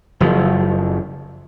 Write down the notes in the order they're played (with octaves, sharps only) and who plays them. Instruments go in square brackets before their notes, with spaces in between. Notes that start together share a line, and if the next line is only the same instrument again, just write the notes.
[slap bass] F#1 F3